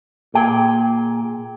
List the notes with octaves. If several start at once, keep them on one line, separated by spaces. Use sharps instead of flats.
A#2 G#4 G5